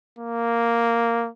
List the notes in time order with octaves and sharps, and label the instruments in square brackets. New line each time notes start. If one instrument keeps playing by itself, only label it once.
[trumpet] A#3